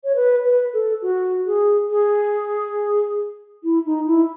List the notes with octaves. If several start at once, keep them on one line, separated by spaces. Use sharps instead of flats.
C#5
B4
B4
A4
F#4
G#4
G#4
E4
D#4
E4